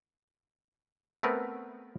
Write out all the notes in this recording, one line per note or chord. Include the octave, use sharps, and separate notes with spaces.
A3 B3 C4 A#4 B4